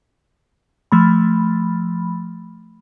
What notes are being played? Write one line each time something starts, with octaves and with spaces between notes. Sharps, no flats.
F3 A3 B5